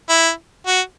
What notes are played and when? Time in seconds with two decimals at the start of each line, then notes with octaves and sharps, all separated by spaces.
0.09 E4
0.67 F#4